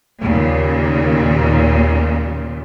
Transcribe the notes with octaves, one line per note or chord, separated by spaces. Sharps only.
D#2 A#2 C#3